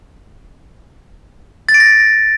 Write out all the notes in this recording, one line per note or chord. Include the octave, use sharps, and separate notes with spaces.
A6
D7
A#6